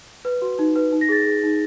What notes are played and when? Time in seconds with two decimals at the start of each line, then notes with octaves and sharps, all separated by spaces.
0.25 B4
0.42 F#4
0.59 D#4
0.76 B4
0.92 D#4
1.01 A#6
1.09 G#4 A6
1.21 G#4 A#6
1.43 D#4